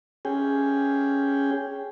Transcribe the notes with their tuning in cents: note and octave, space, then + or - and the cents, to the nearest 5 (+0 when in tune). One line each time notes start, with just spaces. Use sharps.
C#4 +0 G#4 +0 G5 +0